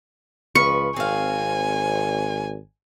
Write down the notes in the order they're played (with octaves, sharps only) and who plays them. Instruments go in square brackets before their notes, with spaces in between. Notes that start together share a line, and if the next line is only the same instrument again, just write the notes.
[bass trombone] C#2 [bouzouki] F3 B4 [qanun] C#6
[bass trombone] G#1 [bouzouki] C4 F5 [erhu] G#5